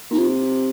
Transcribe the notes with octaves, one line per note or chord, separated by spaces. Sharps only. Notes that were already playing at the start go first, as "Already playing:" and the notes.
A#2 D#4
C3 F4